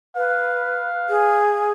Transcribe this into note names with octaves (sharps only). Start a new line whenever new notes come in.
B4 F5
G#4